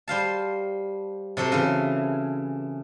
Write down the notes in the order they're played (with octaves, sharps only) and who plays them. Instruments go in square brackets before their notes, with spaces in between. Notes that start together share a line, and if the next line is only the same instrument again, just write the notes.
[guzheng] G3 C5 F5 A5
C3 F#3 A4 C5
C#3 E3